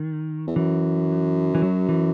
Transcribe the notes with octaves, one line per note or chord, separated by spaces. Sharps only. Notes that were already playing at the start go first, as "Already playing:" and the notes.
Already playing: D#3
E2
F#2 E3
E3
F#2 F#3
E3